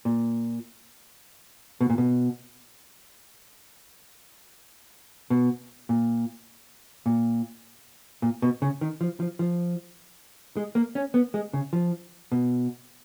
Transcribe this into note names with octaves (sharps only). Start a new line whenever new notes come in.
A#2
B2
A#2
B2
B2
A#2
A#2
A#2
B2
C#3
D#3
F3
F3
F3
G#3
A#3
C#4
B3
G#3
C#3
F3
B2